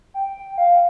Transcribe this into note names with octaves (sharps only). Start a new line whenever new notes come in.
G5
G5
F5
F5